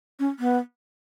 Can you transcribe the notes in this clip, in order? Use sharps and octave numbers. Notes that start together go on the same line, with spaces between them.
C#4
B3